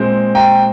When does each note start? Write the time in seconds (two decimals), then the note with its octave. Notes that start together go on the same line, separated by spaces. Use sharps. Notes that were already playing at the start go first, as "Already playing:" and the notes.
Already playing: A#2 G#3 C4
0.35 G5 A#5